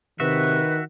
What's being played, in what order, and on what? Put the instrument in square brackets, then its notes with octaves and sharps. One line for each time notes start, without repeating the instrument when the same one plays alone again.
[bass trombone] C3 [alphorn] D#3 [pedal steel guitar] F#4 E5 [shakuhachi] B4